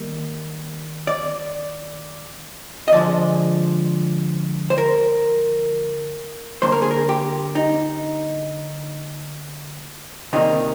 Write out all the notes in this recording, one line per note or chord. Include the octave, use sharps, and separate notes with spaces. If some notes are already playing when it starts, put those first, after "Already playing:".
Already playing: D#3 G3 A#3
D5
D#5
D3 F3 G#3 D5
C5
A#4
D3 G3 A#3 C5
A#4
G#4
A#4
G4
D#4
C3 D#3 G3 A#3 D#4